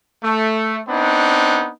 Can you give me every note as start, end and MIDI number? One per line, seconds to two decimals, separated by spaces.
0.23 0.81 57
0.89 1.69 59
0.89 1.69 60
0.89 1.69 62
0.89 1.69 63